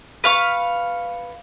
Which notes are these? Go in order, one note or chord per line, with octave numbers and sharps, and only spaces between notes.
B4 F5 C#6